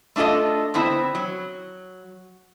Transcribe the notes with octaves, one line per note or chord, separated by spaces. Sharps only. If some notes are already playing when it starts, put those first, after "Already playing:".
A3 D4 F4 A4 D#5
D3 B3 C4 E4
F#3